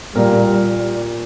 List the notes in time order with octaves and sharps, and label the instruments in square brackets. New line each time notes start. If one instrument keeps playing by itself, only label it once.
[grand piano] A#2 A#3 G4 A#4 [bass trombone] G3